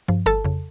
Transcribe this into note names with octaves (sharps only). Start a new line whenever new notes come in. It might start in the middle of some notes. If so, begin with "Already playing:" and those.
G2 F3
G1 A4 A5
F2 C#3